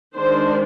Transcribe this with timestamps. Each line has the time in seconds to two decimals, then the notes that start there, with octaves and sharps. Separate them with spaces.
0.16 D#3 G#3 D4 C5